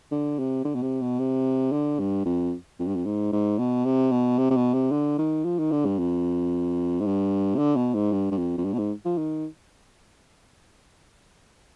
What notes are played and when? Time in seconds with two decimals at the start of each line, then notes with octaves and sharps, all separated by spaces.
0.12 D3
0.39 C3
0.65 D3
0.75 B2
0.83 C3
1.02 B2
1.19 C3
1.72 D3
1.99 G2
2.25 F2
2.79 F2
2.87 G2
2.96 F2
3.06 G#2
3.33 G#2
3.59 B2
3.85 C3
4.11 B2
4.38 C3
4.51 C3
4.56 B2
4.74 C3
4.92 D3
5.19 D#3
5.45 F3
5.59 D#3
5.71 D3
5.86 G2
5.99 F2
7.01 G#2
7.06 G2
7.55 C3
7.59 D3
7.76 B2
7.94 G#2
8.12 G2
8.32 G2
8.38 F2
8.58 F2
8.65 G2
8.73 B2
8.79 G#2
9.05 F3
9.18 D#3